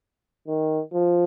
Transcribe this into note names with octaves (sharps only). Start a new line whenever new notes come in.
D#3
F3